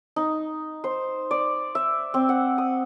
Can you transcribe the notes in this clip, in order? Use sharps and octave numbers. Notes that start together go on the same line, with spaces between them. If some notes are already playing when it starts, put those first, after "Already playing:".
D#4
C5
D5
E5
C4
F#5
D#6